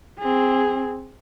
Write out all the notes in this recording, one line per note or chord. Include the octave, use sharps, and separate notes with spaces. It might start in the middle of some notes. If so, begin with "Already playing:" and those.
C4 G#4